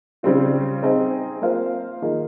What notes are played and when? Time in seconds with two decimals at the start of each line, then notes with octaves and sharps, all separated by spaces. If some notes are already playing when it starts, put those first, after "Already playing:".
0.23 C#3 G3 C4 F4
0.83 C4 D#4 G#4 D#5
1.42 A#3 F4 C5 F5
2.02 D#3 A#3 F4 G#4 D#5